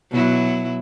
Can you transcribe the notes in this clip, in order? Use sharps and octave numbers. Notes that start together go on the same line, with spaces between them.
B2 F#3 E4